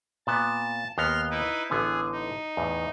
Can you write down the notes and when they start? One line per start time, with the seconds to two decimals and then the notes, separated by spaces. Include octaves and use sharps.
0.27 A#2 B3 A5
0.98 D#2 B3 A#5 C6 F6
1.30 D#4 E4 B4
1.70 A1 D3 B3 G#4
2.12 D#4
2.57 E2 A2